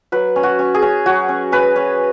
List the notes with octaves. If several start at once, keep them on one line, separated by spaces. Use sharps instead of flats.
F#3 B4
C#4
F#4
C#4
G#4
C#4
F#3 F#4
C#4
C#4 B4
C#4